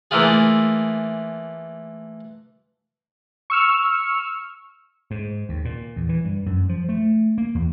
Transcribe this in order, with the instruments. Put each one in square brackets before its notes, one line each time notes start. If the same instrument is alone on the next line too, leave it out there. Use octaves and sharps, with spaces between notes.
[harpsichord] E3 A3 A#3 E4 F4 G#4
[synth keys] C#6 E6 F6
[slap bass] G#2
D#2
A#2
E2
E3
G2
F#2
F3
A3
A#3
E2